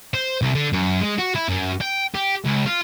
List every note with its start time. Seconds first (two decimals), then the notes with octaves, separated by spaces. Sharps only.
0.14 C5
0.42 C2
0.55 D3
0.73 F#2
1.01 G#3
1.19 F#4
1.35 E4
1.49 F#2
1.81 G5
2.15 G4
2.45 C#2
2.66 F4